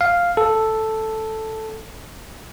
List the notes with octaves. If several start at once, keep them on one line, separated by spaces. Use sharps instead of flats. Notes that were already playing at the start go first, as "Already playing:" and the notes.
F5
A4